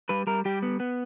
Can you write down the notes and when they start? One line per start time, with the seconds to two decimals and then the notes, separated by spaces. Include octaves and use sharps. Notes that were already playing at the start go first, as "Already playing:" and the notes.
0.09 G3 B4
0.27 G3 A#4
0.45 G3 G4
0.63 B3
0.80 B3